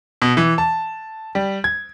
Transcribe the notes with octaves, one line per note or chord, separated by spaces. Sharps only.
B2
E3
A5
G3
G#6